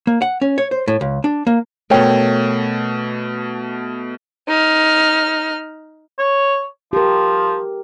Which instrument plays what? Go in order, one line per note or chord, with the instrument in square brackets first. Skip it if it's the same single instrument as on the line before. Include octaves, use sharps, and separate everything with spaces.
[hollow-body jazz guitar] A#3
F#5
C#4
C#5
C5
A2
C#2
D4
A#3
[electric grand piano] B2 A3 [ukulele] A#4 C#5 G5
[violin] D#4 F6
[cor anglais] C#5
[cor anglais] F3 [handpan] G4 A#4